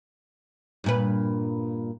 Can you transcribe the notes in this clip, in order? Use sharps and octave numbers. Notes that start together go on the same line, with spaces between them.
G2 A#2 B4